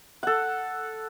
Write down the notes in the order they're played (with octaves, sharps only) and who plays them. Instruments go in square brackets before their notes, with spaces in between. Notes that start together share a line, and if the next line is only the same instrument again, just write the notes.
[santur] A4 F#5